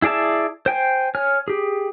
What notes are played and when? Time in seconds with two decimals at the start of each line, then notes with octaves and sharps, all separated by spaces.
0.02 E4 G#4 D5 E5 A5
0.66 C5 G5 G#5
1.15 C#5 G#5 F6
1.48 G4 G#4